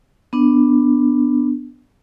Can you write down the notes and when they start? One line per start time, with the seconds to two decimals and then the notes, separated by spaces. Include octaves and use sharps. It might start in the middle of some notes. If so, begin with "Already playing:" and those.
0.33 B3 D4